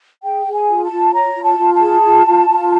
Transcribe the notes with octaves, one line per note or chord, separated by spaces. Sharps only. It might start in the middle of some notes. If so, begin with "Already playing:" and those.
G#4 G5
G#4
G#5
F4
A5
F4
C#5 A#5
F4
A5
F4
A5
G#4
F4
F4
F4